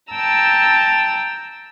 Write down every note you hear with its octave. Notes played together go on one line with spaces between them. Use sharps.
G5 A5 A#5 E6